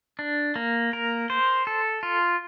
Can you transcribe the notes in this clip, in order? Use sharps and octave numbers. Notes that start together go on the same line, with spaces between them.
D4
A#3
A#4
C5
A4
F4